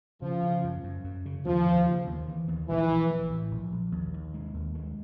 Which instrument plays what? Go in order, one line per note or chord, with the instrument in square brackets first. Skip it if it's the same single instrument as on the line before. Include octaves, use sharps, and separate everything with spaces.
[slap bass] C#3 [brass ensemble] F3
[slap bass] C#3
F#2
F#2
F#2
C#3
[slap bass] D#2 [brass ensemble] F3
[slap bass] D#2
C#3
D#2
E3
D#2
[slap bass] A#1 [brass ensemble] E3
[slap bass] A#1
E3
A2
A#1
A#1
D#2
D#2
G#3
D#2
G#3